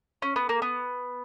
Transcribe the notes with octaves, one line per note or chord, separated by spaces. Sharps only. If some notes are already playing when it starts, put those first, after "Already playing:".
C#4
B3
A#3
B3